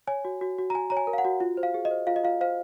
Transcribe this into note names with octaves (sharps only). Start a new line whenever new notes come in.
C#5 G#5
F#4
F#4
F#4
A#5
F#4 G#5
C#5 A#5
G#5
A#4
F5
F#5
F#4
F4
C5
F5
G#4
D#5
C5
F4 F5
D#5
F4 F5
C5 F5